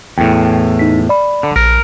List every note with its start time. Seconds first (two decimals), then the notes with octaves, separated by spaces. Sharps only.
0.18 E2 A2 G5
0.79 D#4 B6
1.09 D5 B5
1.43 D3
1.56 A#1 A#4